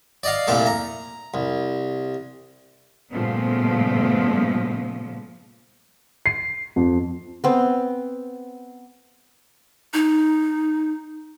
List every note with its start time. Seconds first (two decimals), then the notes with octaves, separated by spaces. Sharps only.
0.23 D5 D#5 F5
0.47 C2 A#2 A3 A4 D6
0.67 A#5
1.34 C2
3.11 G2 A#2 C#3 F3 A3 B3
6.26 C7
6.76 F2
7.44 B3 C4
9.94 D#4